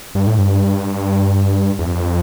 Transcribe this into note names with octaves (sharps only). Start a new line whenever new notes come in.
G2
A2
G2
E2
F2